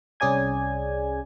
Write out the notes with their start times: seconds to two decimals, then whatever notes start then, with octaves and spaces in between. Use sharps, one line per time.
0.20 C2 C#4 G#4 D5 G#5 G#6